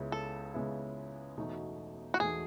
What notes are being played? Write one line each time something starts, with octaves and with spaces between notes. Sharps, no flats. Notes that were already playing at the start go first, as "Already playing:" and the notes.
Already playing: C#2 C#3 G#3 B3 E4
A4
C#2 C#3 G#3 B3 E4
E1 E2 B2 A3 D#4
F#4
E1 E2 B2 A3 D#4 G#4